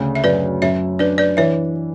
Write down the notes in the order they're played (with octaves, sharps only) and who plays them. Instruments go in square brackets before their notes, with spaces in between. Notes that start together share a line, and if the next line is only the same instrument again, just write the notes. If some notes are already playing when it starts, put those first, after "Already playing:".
Already playing: [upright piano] D2 C#3
[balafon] E5
[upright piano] F#2 [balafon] B4 D5
[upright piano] F#2 [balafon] C#5 E5
[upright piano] D4 [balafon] B4 D5
[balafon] B4 D5
[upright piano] E3 [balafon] C#5 E5